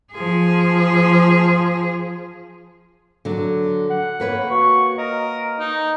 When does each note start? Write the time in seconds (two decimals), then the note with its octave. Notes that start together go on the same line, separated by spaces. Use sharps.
0.13 F3 G#4
3.25 D3 F#3
3.90 F#5
4.20 A#3 B4 C#5
4.51 F#4 C#6
4.98 A#4 D#5
5.59 D#4